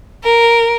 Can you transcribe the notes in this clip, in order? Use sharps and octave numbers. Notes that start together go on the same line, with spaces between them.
A#4